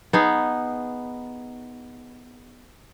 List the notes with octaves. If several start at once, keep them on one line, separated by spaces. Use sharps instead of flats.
B3 D#4 G#4